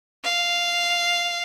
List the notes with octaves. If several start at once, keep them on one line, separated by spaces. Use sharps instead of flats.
F5